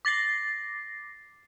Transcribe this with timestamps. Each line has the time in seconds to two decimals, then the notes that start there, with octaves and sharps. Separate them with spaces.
0.05 D6 A6 A#6 C7